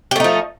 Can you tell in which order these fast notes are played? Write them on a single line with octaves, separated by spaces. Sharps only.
G4 A3 D#4 F3